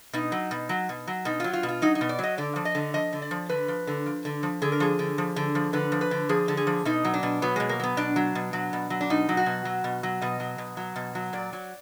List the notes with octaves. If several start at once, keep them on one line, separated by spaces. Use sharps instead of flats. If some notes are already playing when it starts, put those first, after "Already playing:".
B2 D#4
F#3
B2
F#3
B2
F#3
B2 D#4
F#3 F4
F4
B2
F4
F#3 D#4
D#4
B2
D5
F#3 D#5
D3 D5
F3
D#5
D3
F3 D#5
D3
D5
F3
D3 B4
F3
D3
F3
D3
F3
D3 G#4
A#4
F3 G#4
D3
F3
D3
F3
D3 B4
F3
B4
D3
F3 G#4
D3
G#4
F3
B2 D#4
F#3
D4
B2
F#3 B3
B2 G#3
A#3
F#3 B3
B2 D4
F#3
B2
F#3
B2
F#3
D4
B2 D#4
F#3
F#4
B2
F#3
B2
F#3
B2 D#5
F#3
B2
F#3
B2
F#3
A#2 D5
F#3